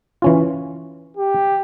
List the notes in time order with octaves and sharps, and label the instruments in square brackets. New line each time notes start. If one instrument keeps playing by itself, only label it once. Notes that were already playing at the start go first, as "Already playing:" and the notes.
[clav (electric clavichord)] E3 C#4 F4
[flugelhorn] G4